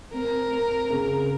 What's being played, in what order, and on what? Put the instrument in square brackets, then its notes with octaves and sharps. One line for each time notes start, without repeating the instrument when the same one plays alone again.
[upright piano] C4 [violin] A#4
[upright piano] C4
C#3